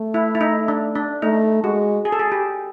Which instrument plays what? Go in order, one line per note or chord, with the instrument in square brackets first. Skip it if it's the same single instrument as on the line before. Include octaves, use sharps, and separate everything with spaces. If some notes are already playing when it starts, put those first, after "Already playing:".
Already playing: [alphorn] A3
[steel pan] E4
E4
D#4
D4
D4
[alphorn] A3 [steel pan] D#4
[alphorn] G#3 [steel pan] F#4
[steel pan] G#4
A4
G#4
G4